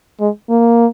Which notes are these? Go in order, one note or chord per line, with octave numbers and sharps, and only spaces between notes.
G#3
A#3